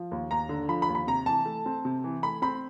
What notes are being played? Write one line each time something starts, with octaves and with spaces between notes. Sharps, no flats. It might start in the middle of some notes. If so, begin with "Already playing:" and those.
Already playing: F3
D#2
D#2 A#5
D3
F3 B5
B5
D#2
B5
C3 A#5
E3 A5
A3
C4
C3
E3
A3 B5
C4 B5